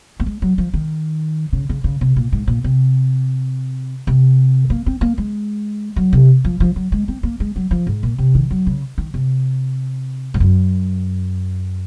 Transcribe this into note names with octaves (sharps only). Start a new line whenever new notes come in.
A#3
G#3
F#3
F3
D#3
C#3
C#3
C#3
C3
A#2
G#2
A#2
C3
C3
A#3
C4
A#3
G#3
F#3
C3
F3
F3
F#3
G#3
C4
A#3
G#3
F#3
F3
G#2
A#2
C3
D#3
F#3
C#3
D#3
C3
G#2
F#2